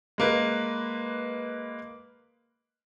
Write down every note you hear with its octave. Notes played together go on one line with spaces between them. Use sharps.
G#3 A#3 B4